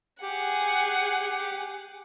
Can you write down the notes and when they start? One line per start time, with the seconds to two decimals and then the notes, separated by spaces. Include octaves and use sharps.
0.22 G4 G#4 F#5